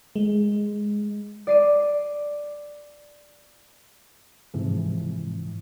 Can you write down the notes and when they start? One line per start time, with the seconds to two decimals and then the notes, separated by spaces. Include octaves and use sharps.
0.16 G#3
1.47 D5 C7 D#7
4.54 G#2 C3 E3 F3